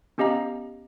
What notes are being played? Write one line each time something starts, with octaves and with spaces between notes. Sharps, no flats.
B3 C#4 G4 D#5 F5 A#5